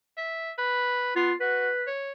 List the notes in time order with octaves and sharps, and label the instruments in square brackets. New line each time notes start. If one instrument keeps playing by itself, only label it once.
[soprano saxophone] E5
B4
[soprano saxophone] B3 [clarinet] F4
[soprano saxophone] F#4 [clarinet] B4
[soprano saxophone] C#5